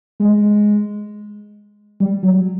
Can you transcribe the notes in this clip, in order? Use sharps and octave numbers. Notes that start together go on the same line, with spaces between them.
G#3
G3
F#3